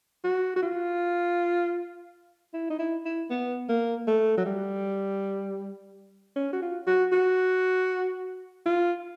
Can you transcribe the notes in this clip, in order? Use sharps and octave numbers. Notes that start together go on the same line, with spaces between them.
F#4
F#4
F4
E4
D#4
E4
E4
B3
A#3
A3
F#3
G3
C#4
F#4
F4
F#4
F#4
F4